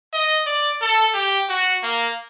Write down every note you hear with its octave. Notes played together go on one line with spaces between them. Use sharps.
D#5
D5
A4
G4
F#4
A#3